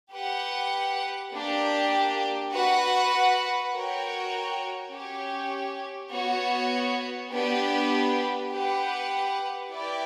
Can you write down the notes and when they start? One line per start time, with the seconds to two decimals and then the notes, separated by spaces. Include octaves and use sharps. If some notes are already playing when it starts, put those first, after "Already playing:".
0.12 G4 B4 F#5
1.31 A#3 D4 G4
2.51 F#4 B4 F#5
3.71 F#4 A#4 C#5 G5
4.90 C#4 G4 C#5
6.10 B3 F#4 C#5
7.30 B3 D4 G4 B4
8.50 G4 B4 F#5
9.70 E4 G4 B4 D5 G5